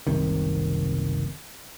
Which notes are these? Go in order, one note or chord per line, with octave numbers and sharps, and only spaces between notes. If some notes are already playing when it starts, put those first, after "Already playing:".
F#1 C2 C3 D#3